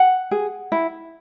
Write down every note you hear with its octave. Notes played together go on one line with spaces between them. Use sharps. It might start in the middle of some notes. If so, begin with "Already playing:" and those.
Already playing: F#5
G#4
E4